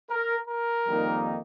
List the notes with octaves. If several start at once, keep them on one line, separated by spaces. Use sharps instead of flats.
A#4
A#4
F2 D#3 G3 A#3 D#4